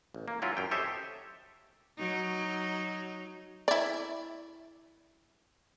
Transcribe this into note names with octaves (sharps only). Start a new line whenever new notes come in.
A1
A#3
F#3 C#4 E4 F4
F#2 G5
G4 A4 C5 C#5 D#5 E5
F#3 D#4
E4 D5